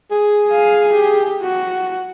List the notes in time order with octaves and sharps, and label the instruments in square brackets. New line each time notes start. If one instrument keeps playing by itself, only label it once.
[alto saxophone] G#4
[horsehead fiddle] F5 G#5
G4
F#4